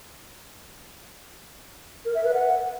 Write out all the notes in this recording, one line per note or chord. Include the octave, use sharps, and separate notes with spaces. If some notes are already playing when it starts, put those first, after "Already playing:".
A#4
E5
B4
F#5